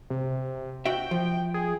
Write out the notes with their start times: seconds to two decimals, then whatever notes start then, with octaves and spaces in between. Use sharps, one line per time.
0.10 C3
0.86 F#4 E5 G5
1.11 F3
1.54 G#4